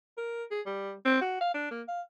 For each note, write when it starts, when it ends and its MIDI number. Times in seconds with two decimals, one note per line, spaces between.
0.17 0.44 70
0.51 0.61 68
0.66 0.93 55
1.05 1.19 60
1.21 1.39 66
1.41 1.52 77
1.54 1.67 62
1.71 1.82 58
1.88 2.01 77